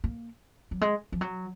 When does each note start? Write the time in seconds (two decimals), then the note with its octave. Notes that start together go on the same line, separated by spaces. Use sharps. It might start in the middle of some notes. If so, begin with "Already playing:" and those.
0.04 A#3
0.71 F#3
0.81 G#3
1.12 F3
1.21 F#3